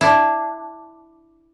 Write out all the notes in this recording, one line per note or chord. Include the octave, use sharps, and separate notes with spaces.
D4 E4